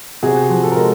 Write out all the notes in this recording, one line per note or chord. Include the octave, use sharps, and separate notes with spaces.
C3 F#4 G#4
F3
A4
A#4
G#3